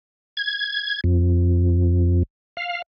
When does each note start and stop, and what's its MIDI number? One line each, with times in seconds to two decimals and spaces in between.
0.37 1.01 92
1.04 2.23 41
2.57 2.82 77